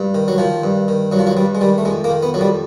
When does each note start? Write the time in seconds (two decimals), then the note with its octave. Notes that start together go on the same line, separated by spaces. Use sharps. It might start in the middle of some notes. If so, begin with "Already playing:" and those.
Already playing: G2
0.15 D#3
0.28 F#3
0.38 D#3 F3
0.63 G2
0.88 D#3
1.12 G2 F#3
1.19 F3
1.27 F#3
1.37 G2 G3
1.55 G#3
1.61 D#3 G3
1.78 A3
1.85 F2 G#3
2.04 A#3
2.09 D#3
2.23 B3
2.34 F2 F#3
2.41 G3